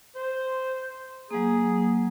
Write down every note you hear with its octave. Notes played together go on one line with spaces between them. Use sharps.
C5
F#3 A#3 G#4